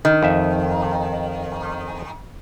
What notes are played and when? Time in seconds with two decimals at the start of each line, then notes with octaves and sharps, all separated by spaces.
0.05 D#3
0.23 F2 E5